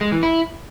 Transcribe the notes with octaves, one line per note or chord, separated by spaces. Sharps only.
G#3
E3
E4